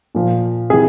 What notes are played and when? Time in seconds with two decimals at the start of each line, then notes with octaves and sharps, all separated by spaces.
0.15 A#2 F3
0.70 C3 E3 G#4